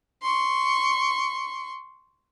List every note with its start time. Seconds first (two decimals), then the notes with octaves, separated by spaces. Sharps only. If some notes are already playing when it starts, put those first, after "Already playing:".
0.22 C6 C#6